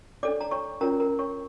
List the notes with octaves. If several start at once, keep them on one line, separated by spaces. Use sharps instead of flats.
D4 A4 C#5 D5 D6
A#5
C#5 C#6
C#4 F4 A#4 C#5 A#5
A#4 A#5
C#5 C#6